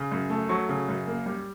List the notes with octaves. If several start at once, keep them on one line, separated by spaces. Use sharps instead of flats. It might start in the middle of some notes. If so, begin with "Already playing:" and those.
Already playing: C#3
F#2
A3
F#3 C#6
C#3
F#2
A#3
G3